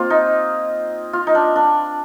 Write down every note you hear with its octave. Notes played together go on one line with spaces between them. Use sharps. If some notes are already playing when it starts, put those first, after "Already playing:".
Already playing: A#3 C4 F4
D#4
F4
D#4
D4
D4